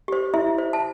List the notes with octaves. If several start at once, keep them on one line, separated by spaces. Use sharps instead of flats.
G4 C5
E4 E5
C5
A5